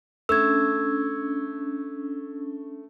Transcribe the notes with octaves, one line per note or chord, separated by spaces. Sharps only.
A3 C#4 D4 E6 G#6